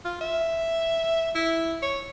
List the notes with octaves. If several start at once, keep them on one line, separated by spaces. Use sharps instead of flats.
F4
E5
E4
C#5